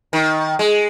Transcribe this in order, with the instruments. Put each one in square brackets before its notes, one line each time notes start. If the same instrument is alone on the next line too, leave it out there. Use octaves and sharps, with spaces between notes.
[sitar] D#3
G#3